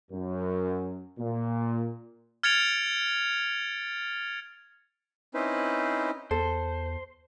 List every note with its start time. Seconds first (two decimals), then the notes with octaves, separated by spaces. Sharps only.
0.11 F#2
1.19 A#2
2.43 F6 G#6 A6 C#7 D7 F7
5.34 C4 C#4 D#4 E4 B4 C5
6.31 E2 A4 C5